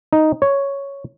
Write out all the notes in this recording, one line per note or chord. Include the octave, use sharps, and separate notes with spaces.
D#4
C#5